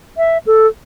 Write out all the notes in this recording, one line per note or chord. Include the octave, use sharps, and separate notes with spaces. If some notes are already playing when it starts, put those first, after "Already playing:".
E5
A4